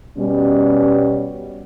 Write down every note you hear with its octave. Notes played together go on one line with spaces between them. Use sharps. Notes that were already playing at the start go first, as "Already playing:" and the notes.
B2 G3 C#4